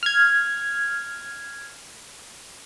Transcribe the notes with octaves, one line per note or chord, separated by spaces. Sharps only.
F6 G#6